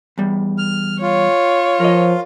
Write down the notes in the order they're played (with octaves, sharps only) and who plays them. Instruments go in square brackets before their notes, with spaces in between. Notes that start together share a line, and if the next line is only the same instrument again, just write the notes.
[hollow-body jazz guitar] E2 G3
[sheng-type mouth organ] F6
[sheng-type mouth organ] F4 [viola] C#5
[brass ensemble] F3 [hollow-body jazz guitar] A#4 D#5